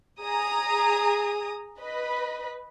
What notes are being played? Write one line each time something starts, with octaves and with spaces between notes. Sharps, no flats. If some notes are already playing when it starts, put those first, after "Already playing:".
G#4 A#5 D#6
B4 D#5 B5